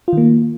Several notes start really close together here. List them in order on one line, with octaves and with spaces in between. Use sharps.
F4 D#3 A#3